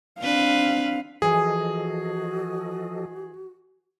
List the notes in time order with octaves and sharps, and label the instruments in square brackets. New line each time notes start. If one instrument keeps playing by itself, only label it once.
[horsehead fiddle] C4 F5 [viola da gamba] D4 B4
[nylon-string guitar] E3 G#5 [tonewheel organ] F3 A4 D#5 [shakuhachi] F#4 [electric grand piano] G#4